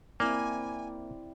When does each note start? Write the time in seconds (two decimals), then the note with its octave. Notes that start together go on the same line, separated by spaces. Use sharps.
0.20 A#3 C4 E4 D5 G#5